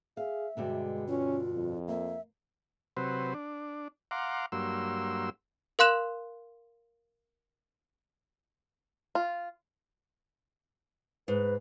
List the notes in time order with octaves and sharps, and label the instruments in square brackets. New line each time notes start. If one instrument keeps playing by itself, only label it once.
[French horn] G#4 [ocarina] E5 [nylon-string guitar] F5
[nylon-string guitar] G2 B2 D3 [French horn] G#3
[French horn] C#4 [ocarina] F4
[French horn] F2
[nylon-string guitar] A#3 [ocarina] E5
[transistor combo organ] C3 F#3 B4 C5
D4
F5 F#5 A#5 C6 D6
G2 F#3 A#3 C6 E6
[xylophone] A#4 F5 C6 F#6 E7
[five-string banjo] F4
[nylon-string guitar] G#2 [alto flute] B4